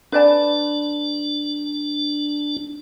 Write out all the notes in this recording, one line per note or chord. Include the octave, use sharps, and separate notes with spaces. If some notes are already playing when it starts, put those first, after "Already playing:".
D4 B4 D5 A5